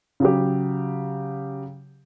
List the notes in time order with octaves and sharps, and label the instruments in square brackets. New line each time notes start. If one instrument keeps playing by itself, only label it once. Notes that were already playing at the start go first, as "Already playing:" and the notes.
[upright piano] C#3 F#3 G4